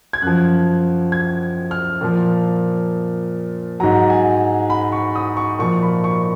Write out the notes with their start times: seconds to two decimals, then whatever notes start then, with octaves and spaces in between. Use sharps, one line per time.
0.13 G#6
0.22 F#2 F3 F#6
1.12 G#6
1.71 F6
2.01 A#2 F3
3.80 G#2 F#3 A#5
4.10 G#5
4.70 B5
4.92 C#6
5.15 D#6
5.37 C#6
5.59 A#2 F3 C#6
5.83 B5
6.04 C#6